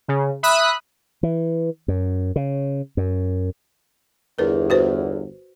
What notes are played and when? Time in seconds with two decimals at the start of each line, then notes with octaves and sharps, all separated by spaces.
0.08 C#3
0.43 E5 B5 D#6 F#6
1.23 E3
1.88 F#2
2.36 C#3
2.97 F#2
4.39 G1 E2 A#4 B4
4.70 F#4 B4 C5